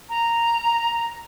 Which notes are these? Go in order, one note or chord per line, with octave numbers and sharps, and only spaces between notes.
A#5